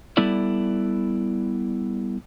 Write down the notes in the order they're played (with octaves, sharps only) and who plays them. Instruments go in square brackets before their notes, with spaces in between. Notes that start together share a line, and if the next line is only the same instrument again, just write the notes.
[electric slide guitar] G3 B3 E4 A4 D5